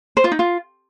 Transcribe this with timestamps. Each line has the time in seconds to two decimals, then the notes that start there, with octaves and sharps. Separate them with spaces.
0.17 C5
0.24 F4
0.32 D#4
0.39 F4